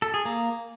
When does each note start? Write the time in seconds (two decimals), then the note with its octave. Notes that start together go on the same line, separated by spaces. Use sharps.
0.02 A4
0.14 G#4
0.25 A#3